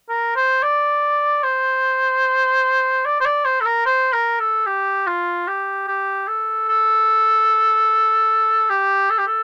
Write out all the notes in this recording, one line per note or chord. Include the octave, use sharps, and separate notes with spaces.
A#4
C5
D5
C5
D5
C5
D5
C5
A4
A#4
C5
A#4
A4
G4
F4
G4
G4
A4
A4
G4
A4
G4
A4